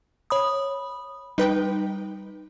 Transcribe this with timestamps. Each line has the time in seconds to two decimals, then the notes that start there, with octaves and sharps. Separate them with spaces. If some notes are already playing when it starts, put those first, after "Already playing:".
0.30 C#5 B5 D#6
1.38 G3 D#4 B4 G5